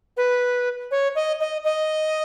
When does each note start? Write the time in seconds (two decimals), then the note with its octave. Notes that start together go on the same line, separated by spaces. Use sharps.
0.17 B4
0.91 C#5
1.15 D#5
1.40 D#5
1.65 D#5